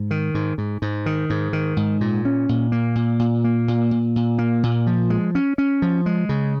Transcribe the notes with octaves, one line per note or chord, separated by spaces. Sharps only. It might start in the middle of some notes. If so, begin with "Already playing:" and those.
Already playing: G#2
D#3
G#2
G#2
G#2
D#3
G#2
D#3
G#2
A#2
C#4
A#2
A#3
A#2
A#2
A#3
A#2
A#2
A#2
A#3
A#2
F3
G#3
C#4
C#4
F3
G#3
C#3